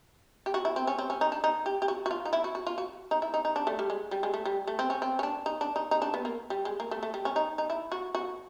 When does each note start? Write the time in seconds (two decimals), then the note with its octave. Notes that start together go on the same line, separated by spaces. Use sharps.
0.46 G4
0.54 F#4
0.65 E4
0.76 C4
0.87 C#4
0.99 C4
1.10 C#4
1.21 D#4
1.32 D4
1.44 D#4
1.66 G4
1.82 G4
1.88 F#4
2.06 F#4
2.11 F4
2.25 D#4
2.33 E4
2.44 F#4
2.55 F#4
2.67 F4
2.78 F#4
3.11 D#4
3.22 E4
3.34 D#4
3.45 D#4
3.56 D4
3.67 A3
3.79 G3
3.90 G#3
4.11 G3
4.23 G#3
4.34 A3
4.45 G3
4.67 A3
4.79 C4
4.90 C#4
5.02 C4
5.19 C#4
5.23 D4
5.46 D#4
5.61 D4
5.76 D#4
5.91 D#4
6.02 D4
6.14 B3
6.25 A#3
6.50 G3
6.65 G#3
6.80 A#3
6.91 A3
7.03 A3
7.14 G3
7.25 C#4
7.36 D#4
7.58 D#4
7.70 E4
7.92 F#4
8.15 F#4